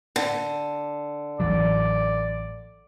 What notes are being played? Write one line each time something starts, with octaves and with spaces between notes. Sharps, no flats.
D3
A1 E3 F#3 D5